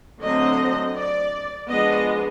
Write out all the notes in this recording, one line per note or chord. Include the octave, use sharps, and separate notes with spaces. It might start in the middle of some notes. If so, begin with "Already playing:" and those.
D3 F#3 A3 C4 D#5
D5
F3 G#3 B3 D4 D#5